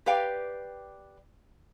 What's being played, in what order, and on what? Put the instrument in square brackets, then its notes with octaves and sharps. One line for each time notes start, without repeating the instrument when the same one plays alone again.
[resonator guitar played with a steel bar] G4 B4 D5 F5 G5